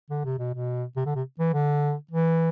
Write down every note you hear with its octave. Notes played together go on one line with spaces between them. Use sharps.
D3
C3
B2
B2
C3
D3
C3
E3
D3
E3